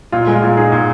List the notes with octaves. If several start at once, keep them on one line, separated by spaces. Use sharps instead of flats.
A#2 F4
G#3
F4
A#2
D#4 G#4
A#2